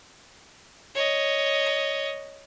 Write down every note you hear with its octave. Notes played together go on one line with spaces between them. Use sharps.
C#5 D#5